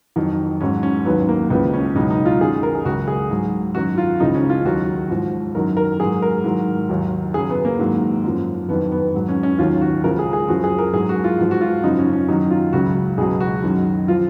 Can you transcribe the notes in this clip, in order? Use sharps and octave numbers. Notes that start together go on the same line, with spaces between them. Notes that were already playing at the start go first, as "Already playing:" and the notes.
F2 D#3 F#3
G#2 F#3 C#4
C#4
D#2 D#3 F#3 B3
A#3
C#2 C#3 F3 B3
C#4
C#2 B2 F#3 D#4
D#4
F4
F#2 D#3 F#3 G#4
A#4
G#4
C#2 C#3 F#3 F#4
G#4
G#2 F#3
F#2 D#3 F#3 F#4
F4
C#2 C#3 F3 D#4
C#4
F4
D#2 D#3 F#3 F#4
G#2 F3
F#2 D#3 F#3 A#4
A#4
G#2 F#3 G#4
A#4
G#2 D#3 F#3
D#2 D#3 F#3
F#2 C#3 F#3 G#4
B3
A#3
G#2 D#3 F#3
F#2 F3
F2 D#3 F#3 B3
B3
G#2 F#3
C#4
C#4
D#2 D#3 F#3 F4
F#4
C#2 C#3 F3 A#4
G#4
G#4
F#2 F3 F#4
G#4
A#4
G#2 F#3 G#4
F#4
F4
G#2 F3
F#4
F4
F#2 C#3 F3 D#4
C#4
C#4
F#2 D#3 F#3 D#4
F4
C#2 C#3 F#3 F#4
C#2 B2 F#3 G#4
F#4
F#2 D#3 F#3
F3 F4